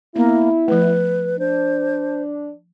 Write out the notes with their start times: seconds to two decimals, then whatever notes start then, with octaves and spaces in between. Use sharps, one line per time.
0.16 A#3 B3 E4
0.68 F3 A3 B4
1.39 D4 C5